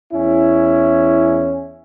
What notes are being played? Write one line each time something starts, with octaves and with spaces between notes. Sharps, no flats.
E2 C#4 E4